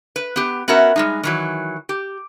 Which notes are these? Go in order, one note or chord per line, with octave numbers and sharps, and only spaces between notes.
B4
B3 G4
B3 C#4 F#4 A#4 E5
G3 G#3 D#4
D#3 E3 F#3
G4